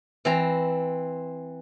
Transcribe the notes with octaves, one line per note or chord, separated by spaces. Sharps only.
E3 C4 A#5